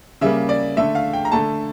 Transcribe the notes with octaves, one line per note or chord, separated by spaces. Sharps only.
C#3 G3 A#3 E5
D5
D3 A3 E5
F5
G5
A#5
D3 A3 A5